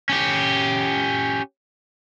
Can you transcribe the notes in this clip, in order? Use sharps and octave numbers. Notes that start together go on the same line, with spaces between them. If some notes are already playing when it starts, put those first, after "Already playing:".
C#4 G4